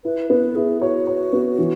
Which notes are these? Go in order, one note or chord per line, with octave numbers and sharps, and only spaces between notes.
E4 B4
B3 B4
E4 G#4
F#4 C#5
C#5
B3
E3